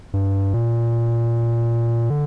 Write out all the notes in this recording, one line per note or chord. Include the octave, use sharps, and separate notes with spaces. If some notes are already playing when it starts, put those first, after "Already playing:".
G2
A#2
D3